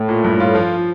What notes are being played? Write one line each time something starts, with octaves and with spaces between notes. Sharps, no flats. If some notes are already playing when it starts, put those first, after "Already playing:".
Already playing: A2
A#2
G2
F4
F3